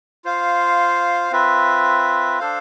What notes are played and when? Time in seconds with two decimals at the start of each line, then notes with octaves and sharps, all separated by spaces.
0.25 F4 C5 F5
1.31 C4 F4 B4 E5
2.39 D4 A4 C5 F5